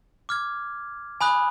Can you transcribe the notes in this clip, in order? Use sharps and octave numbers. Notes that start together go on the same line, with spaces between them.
D6 F6 G#6
G#5 B5 D#6 F#6